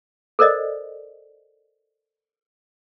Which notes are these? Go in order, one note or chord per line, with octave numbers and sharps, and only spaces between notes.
A4 A#4 C5 D5 D#5